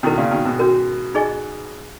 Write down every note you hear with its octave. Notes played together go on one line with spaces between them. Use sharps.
B2 D#3 C#4 E4 A#4
A#2 C#3
B2 D#3
G#2 B2
C#4 F#4 A#4
D#4 G#4 D#5 G#5 C#6